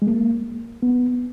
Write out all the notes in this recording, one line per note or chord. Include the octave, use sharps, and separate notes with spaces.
G#3
A#3
B3